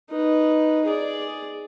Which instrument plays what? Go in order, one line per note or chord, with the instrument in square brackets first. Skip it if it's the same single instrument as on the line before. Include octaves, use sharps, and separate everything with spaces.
[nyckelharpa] D#4 B4
G#4 D5